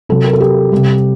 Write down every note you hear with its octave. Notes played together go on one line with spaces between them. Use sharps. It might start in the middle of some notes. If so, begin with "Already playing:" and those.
C3 F#3 A4
A#4
A4
G4
C3 G3